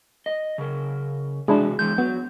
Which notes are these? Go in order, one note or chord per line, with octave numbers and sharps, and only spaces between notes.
D#5
C#3 A#4
C3 E3 G#3 D4 E4 F#4 G#4
E3 G#3 G6
F#3 B3